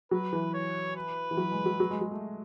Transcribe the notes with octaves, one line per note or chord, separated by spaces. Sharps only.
F#3 B4
E3
C#5
B4
E3
F#3
G#3
F#3
F#3
G#3
F#3
A3